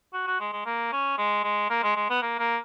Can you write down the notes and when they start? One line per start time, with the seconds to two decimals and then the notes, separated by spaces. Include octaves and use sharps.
0.13 F#4
0.27 F#4
0.40 G#3
0.53 G#3
0.66 A#3
0.93 C#4
1.18 G#3
1.44 G#3
1.70 A#3
1.83 G#3
1.96 G#3
2.10 B3
2.22 A#3
2.39 A#3